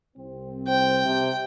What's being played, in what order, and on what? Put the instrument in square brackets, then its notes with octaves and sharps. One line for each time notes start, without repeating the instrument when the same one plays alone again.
[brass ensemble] C2 C4
[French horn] C5 [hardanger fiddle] G5
[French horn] C3